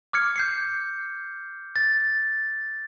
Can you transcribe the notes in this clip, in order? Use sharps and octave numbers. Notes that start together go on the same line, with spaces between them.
D6 F6 G#6 C#7
G6 C7 C#7
A6